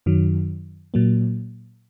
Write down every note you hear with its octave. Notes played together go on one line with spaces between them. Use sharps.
F#2 D#3 F#3
A#2 F#3 A#3